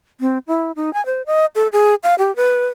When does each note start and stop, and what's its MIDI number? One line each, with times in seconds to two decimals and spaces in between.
0.21 0.38 60
0.47 0.72 64
0.76 0.93 63
0.94 1.04 80
1.06 1.22 72
1.26 1.46 75
1.55 1.68 69
1.73 1.95 68
2.03 2.15 77
2.19 2.34 67
2.36 2.67 71